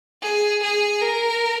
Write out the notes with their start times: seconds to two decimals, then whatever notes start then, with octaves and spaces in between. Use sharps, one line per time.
0.22 G#4
0.62 G#4
1.01 A#4